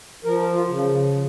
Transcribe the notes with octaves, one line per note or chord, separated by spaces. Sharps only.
F3 A#4
F4
C#3